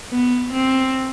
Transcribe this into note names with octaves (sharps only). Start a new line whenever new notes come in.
B3
C4